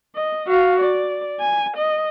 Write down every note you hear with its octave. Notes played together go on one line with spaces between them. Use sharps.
D#5
F#4 F5
D5
G#5
D#5